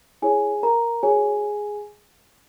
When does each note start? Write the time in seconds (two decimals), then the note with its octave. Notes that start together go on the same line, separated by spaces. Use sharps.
0.22 E4 G#4 C#5 G#5
0.63 A#4 A#5
1.03 F#4 G#4 C#5 G#5